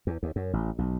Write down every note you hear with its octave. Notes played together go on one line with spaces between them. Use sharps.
E2
D#2
F#2
A1
B1